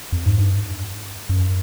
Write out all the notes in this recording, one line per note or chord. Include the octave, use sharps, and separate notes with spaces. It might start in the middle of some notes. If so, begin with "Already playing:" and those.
F2
G#2
G2
F#2